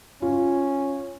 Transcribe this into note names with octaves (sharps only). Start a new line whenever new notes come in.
C#4 F4